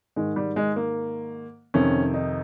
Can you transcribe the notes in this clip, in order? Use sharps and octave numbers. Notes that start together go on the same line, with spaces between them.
G#2 D#3 G#3
G3
G#3
A#3
F2 C3 D#3 C#4
D#4